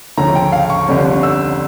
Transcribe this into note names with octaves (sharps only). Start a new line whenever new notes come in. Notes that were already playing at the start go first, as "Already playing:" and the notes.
D2 C#3 F3 A3 C#4 A#5
G5
F5
C#6
G1 F2 D3 G3 C#4
E6